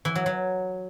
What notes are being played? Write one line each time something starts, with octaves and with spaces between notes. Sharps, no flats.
E3
F#3
F#3